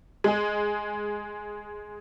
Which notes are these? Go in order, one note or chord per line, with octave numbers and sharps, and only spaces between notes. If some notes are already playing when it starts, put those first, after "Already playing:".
G#3 G#4